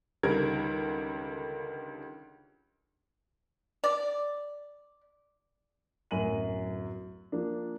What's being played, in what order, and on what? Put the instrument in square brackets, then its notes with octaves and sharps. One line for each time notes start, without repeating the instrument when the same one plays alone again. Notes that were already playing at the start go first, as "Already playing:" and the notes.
[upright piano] C#2 D3 D#3 G3 A#4 G#6
[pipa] D5
[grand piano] D1 F#2 A#4 G#5 D#7 F#7
F3 A#3 D4